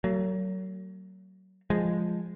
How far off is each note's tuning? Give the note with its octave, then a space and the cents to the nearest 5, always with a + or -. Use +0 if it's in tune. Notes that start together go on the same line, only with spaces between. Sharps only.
F#3 +25 A#3 -45
F3 +0 G#3 -10